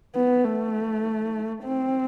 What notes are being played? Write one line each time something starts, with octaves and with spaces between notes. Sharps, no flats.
B3
A3
C4